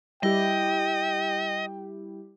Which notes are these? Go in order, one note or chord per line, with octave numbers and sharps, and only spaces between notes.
G3 E4 G4 D#5 G5